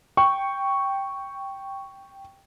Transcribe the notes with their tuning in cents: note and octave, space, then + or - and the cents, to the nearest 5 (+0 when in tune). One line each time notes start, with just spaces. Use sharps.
G5 +0 C#6 +0